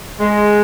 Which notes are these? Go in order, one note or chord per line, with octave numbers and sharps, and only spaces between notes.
G#3